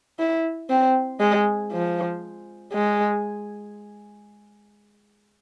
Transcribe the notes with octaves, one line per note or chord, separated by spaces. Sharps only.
E4
C4
G#3
F3
G#3